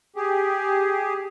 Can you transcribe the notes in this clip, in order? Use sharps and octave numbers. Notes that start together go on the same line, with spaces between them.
G4 G#4